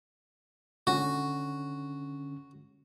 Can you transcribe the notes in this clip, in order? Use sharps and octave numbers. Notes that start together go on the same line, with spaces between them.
D3 C#4 F#4